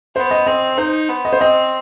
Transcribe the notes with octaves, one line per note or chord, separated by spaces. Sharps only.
B3 C5
D#5
C4 D#5
D#4 C5
B3
D#5
C5
C4 D#5